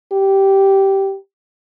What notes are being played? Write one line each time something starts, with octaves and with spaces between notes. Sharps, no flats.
G4